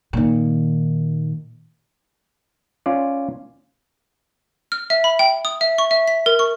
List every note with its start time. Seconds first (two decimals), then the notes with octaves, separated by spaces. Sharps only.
0.13 A#2 D#3
2.86 C#4 F4 D5
4.72 F6
4.90 E5
5.04 B5
5.19 G5
5.45 D#6
5.61 E5
5.78 C#6
5.91 E5
6.08 B6
6.26 A#4
6.39 C#6